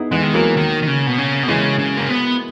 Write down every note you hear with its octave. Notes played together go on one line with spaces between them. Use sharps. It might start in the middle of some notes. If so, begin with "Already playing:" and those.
Already playing: B3 D#4 E4 G#4
E3 G#3 B3
D#3
E3 F#3 A#3
D#3
D#3
C#3
B2
C#3
B2
C#3 E3 G#3
C#3
A#3
B3